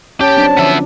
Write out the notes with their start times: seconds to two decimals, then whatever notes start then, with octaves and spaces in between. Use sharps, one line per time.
0.21 C#4 G4 C#5 A5
0.37 F#3 C4 D4
0.57 D3 F3 B3 E5